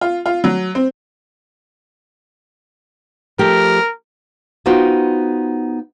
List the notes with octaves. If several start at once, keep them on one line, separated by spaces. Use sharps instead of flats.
F4
F4
F#3
C4
F3 A3 G4 A#4
B3 D#4 F4 F#4 C5 G5